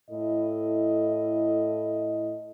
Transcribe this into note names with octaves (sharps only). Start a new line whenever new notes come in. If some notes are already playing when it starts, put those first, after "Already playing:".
A2 E4 A4 D#5